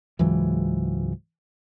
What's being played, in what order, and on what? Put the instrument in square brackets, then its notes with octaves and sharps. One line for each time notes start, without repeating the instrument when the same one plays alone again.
[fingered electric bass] C#2 G#2 E3 F#3